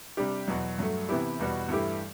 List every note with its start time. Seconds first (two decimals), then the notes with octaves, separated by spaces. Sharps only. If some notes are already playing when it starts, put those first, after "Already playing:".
0.17 C3 G3 D4 G4
0.48 E2 B2 F#3
0.79 G2 F#3 A3
1.09 C3 E3 B3 E4 G4
1.39 E2 B2 G3 B3 F#4
1.69 G2 E3 A3 E4 G4